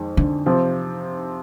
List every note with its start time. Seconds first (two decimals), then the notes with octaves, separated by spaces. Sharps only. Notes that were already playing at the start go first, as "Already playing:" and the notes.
Already playing: F2 D#3 G#3
0.17 D3
0.46 C3 F3 C4